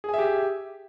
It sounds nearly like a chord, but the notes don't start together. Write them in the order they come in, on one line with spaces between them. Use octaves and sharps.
G#4 G#5 E5 G4